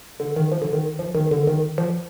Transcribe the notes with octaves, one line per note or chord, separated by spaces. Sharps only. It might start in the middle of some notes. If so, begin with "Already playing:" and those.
D3
D#3
F3
D3
D#3
F3
D#3
D3
D#3
F3